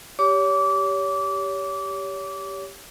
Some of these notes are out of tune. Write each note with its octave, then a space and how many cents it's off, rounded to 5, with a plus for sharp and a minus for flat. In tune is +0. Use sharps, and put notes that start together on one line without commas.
G4 +0 C#5 +30 D6 -25